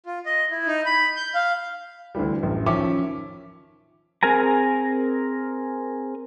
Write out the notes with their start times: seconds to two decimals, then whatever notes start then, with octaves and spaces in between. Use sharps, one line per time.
0.06 F4
0.26 D#5
0.51 E4
0.67 D#4
0.86 B5
1.16 G6
1.34 F5
2.15 D2 D3 E3 G3
2.43 A1 F#2
2.66 D#3 F3 C#4 E5 D6
4.23 C4 G#4 A#4 G#5 A#5